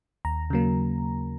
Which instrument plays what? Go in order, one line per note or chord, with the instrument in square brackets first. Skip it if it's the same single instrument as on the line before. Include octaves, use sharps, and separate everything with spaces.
[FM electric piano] D#2 A#5
C#3 F#3 A#3